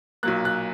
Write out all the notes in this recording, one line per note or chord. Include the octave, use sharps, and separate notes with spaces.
B1 A#2 F#3 A#3 F#6
F#6